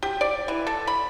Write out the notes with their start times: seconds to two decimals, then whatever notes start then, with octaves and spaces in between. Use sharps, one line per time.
0.03 G4
0.21 D5
0.48 E3
0.67 A4
0.87 B5